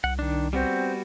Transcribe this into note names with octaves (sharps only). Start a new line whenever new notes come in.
C2 F#5
D#3 D4
G3 B3 C4 F#4